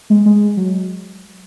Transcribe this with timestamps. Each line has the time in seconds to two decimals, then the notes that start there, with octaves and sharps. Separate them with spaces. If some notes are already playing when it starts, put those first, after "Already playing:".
0.10 G#3
0.26 G#3
0.57 F#3